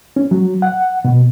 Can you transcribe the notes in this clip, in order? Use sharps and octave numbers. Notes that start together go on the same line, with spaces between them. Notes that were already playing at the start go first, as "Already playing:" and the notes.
C#4
F#3
F#5
B2